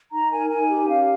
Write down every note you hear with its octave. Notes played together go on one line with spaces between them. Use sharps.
D#4 A#5
A#4 G#5
D#4 G#5
G4
C#4 F5